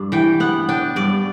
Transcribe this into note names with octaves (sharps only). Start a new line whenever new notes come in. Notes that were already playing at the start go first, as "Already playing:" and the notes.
Already playing: G2 D4
E3 G5
B3 F#5
D4 G5
G2 D5